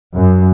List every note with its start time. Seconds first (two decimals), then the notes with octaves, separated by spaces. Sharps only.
0.14 F#2